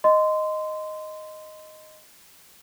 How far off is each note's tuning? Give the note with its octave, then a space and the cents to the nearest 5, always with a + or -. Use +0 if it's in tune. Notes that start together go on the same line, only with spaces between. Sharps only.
D#5 +0 C6 -20